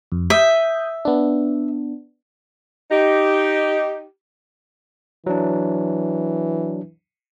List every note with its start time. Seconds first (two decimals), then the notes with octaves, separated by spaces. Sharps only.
0.12 F2
0.30 E5 D#6 G6
1.05 B3 D4
2.92 D#4 G4
5.26 E3 F#3 D4